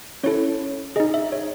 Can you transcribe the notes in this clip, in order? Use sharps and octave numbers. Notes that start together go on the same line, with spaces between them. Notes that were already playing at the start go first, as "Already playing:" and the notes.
C#4 E4 A4 C#5
D#4 G#4 D#5
E5
C#5